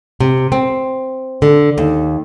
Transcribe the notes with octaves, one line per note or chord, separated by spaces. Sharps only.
C3
C4
D3
D#2